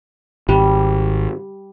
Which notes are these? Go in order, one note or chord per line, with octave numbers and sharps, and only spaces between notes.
G#1 G3